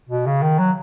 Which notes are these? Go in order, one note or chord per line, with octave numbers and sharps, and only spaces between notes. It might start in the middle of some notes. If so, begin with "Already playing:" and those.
B2
C#3
D#3
F#3